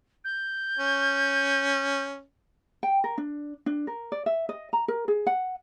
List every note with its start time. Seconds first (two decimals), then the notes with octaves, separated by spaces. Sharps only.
0.25 G6
0.79 C#4
2.83 G5
3.04 A#4
3.18 D4
3.66 D4
3.87 A#4
4.12 D5
4.26 E5
4.49 D#5
4.73 A#5
4.88 A#4
5.08 G#4
5.27 F#5